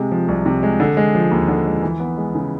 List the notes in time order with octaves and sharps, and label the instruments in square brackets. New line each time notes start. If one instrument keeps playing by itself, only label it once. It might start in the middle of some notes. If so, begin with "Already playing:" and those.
Already playing: [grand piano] C3 G#3
F3
C2
C3
G#3
D3
G#3
F3
D#2
D3
G#3
E3
B3
G#3
C#3